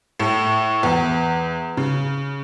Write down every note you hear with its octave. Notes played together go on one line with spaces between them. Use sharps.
A2
E2
C#3